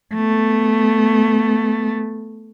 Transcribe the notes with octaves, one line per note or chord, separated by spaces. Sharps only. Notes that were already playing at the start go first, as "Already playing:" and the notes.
A3 B3